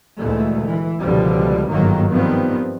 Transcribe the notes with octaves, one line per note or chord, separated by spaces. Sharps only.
D2 A#2 E3 G#3 A3
E3
C#2 B2 D3 F3 G3
G1 G#2 D#3 F#3 A#3
D#3 F3 G3 B3 C4